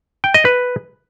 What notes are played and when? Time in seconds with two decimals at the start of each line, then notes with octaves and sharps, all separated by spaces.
0.24 G5
0.34 D#5
0.45 B4